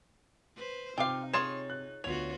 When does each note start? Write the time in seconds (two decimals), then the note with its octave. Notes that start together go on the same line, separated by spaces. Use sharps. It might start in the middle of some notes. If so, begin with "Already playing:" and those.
0.56 B4 C5
0.98 C3 D#4 F4 F5 G5 D6
1.33 F4 G#4 C#5 C6 A6 E7
1.70 F#6
2.04 D2 B3 F4 F#4 C#5 F7